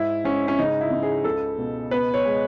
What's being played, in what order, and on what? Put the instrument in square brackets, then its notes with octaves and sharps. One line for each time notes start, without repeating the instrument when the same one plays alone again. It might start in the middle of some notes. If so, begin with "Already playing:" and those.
Already playing: [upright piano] G#2 E4
G#2 C#4
C#4
C#3 D#4
E4
C#3
G#4
C#2 A4
B2
B3 B4
C#5
G#3